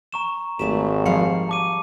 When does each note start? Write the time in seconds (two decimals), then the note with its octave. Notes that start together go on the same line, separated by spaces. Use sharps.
0.12 A#5 C#6 E7
0.59 G#1 G#3 A3 G4 E7
1.06 F3 G3 F5 C#7
1.49 A5 D6 D#7